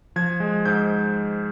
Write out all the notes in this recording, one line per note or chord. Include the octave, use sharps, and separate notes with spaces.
F3 G#6
G#3
G#2 G6